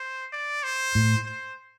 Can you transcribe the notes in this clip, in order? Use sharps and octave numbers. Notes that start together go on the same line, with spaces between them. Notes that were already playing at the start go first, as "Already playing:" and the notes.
Already playing: C5
D5
C5
A2
C5